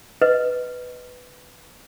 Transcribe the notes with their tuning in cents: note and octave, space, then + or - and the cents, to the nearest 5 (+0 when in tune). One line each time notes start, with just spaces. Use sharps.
B4 +5 D#5 +0